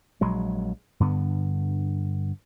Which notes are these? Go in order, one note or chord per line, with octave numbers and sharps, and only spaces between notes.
A#1 F#3 G#3
G2 D3 B3